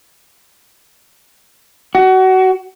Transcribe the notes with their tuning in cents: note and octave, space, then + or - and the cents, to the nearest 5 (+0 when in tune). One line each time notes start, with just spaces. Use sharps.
F#4 +25